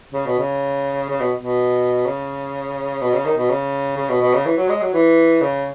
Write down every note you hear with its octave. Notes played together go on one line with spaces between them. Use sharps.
C#3
B2
C#3
C#3
B2
B2
C#3
B2
C#3
D#3
B2
C#3
C#3
B2
B2
C#3
E3
F#3
G#3
F#3
E3
C#3